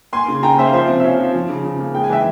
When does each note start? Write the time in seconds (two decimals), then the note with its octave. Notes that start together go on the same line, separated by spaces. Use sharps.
0.12 A#3 G#5 C6
0.28 C#3
0.43 C#3 G5 A#5
0.58 A#3 C5 E5
0.67 F5
0.73 F3 C5 E5
0.88 C3
1.00 E5
1.04 C#4 C#5 F5
1.19 F3
1.35 F3
1.49 C#3
1.65 C#3
1.80 A#3
1.94 G#3 G5
2.04 G#5
2.10 E3 E5 G5